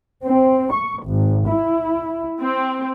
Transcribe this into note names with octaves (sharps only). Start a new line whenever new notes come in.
C4
C#6
G#1
E4
C4